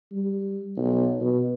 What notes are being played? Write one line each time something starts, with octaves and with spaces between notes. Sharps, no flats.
G3
B1
B2